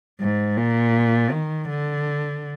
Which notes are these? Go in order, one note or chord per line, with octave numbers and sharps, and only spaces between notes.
G#2
A#2
D#3
D3